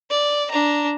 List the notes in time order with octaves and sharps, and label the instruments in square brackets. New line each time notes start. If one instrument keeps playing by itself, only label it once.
[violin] D5
D4 A#5